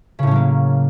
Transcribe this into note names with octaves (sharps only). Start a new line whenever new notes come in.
A2 C#3 F#3 A#3 C#4